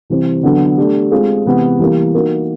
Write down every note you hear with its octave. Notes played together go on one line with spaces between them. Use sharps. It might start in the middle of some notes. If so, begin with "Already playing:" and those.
C3 E3 G3 C4
D3 F#3 B3 D4
A3 D4 G4
G#3 C4 F4 G#4
C3 E3 G#3 B3
E3 G3 A#3
A#3 D#4 F#4 A#4